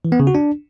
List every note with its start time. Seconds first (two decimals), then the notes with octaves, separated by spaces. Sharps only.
0.05 E3
0.12 B3
0.20 C#3
0.27 F#4
0.35 D4